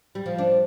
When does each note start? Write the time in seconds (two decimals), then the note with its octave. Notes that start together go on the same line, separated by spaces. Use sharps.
0.15 G3
0.26 F3
0.38 D4